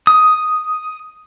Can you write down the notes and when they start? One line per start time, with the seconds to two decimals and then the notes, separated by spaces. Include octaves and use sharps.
0.07 D#6